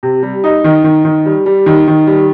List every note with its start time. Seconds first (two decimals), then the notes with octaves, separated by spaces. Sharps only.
0.03 C3
0.23 G3
0.44 D#4
0.64 D#3
0.84 D#3
1.05 D#3
1.26 G3
1.46 G3
1.66 D#3
1.88 D#3
2.07 G3